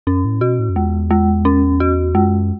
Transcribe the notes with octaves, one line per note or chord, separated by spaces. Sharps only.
F#2 C#4
A2
B2 F#4
A2
F#2
E2 G#3
G#3
C#4
F#4
F#2 G#3